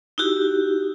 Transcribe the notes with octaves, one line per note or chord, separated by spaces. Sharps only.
D#4 E4 F#4 G4